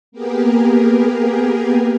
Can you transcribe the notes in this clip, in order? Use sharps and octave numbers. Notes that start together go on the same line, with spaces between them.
A#3 B3 G4 G#4 A#4